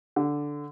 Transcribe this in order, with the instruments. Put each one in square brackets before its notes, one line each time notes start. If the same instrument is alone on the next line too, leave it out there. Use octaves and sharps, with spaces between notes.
[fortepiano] D3